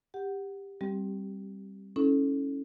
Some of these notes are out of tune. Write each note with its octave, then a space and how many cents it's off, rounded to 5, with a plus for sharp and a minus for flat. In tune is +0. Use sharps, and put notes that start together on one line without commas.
G4 +15 F#5 +10
G3 +0 C4 +20 G4 -10
C#4 +0 E4 -30 A4 -10